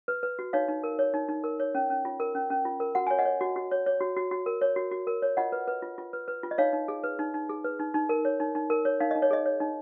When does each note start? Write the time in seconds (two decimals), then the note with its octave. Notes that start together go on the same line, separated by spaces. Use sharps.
0.08 B4
0.23 B4
0.39 F#4
0.53 D#4 C#5 F5
0.68 D#4
0.84 A#4
0.99 C#5
1.14 D#4
1.29 D#4
1.44 A#4
1.60 C#5
1.75 C#4
1.90 C#4
2.05 F4
2.20 A#4
2.35 C#4
2.50 C#4
2.65 F4
2.80 A#4
2.95 F#4 F#5
3.07 C#5 G#5
3.18 D#5 F#5
3.25 C#5
3.41 F#4
3.56 F#4
3.71 C#5
3.86 C#5
4.01 F#4
4.17 F#4
4.31 F#4
4.46 A#4
4.61 C#5
4.76 F#4
4.91 F#4
5.07 A#4
5.22 C#5
5.37 F4 D#5 F#5
5.52 B4
5.67 B4
5.82 F4
5.98 F4
6.13 B4
6.28 B4
6.43 F4
6.51 D#5
6.58 D#4 C#5 F5
6.73 D#4
6.88 G#4
7.04 B4
7.19 D#4
7.34 D#4
7.49 G#4
7.64 B4
7.80 D#4
7.94 D#4
8.09 A#4
8.25 C#5
8.40 D#4
8.55 D#4
8.70 A#4
8.85 C#5
9.00 D#4 F5
9.11 D#4 D#5
9.22 C#5
9.31 G#4 D#5
9.46 C#5
9.60 D#4